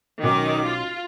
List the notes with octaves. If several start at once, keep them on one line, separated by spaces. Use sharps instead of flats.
B1 D#3 C#4 D#5 D6
F4